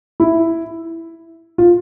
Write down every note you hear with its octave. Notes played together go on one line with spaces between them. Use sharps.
E4
F4